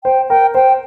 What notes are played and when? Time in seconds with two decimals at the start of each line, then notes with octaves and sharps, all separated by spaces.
0.04 C5 G5
0.29 A#4 G5
0.55 C5 G5